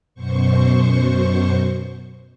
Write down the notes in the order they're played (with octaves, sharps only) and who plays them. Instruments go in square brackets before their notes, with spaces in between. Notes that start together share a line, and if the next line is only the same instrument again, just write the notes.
[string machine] F#2 B2 C5 C#6